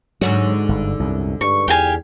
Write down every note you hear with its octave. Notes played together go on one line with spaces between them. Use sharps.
G#2 D3 F#3 F#4
G1
C2 F#2
G2 C#6
E2 G4 F5 G#5